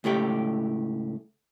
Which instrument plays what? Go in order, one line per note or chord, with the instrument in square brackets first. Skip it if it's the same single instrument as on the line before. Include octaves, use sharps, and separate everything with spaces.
[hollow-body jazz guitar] C#2 A2 A3 G4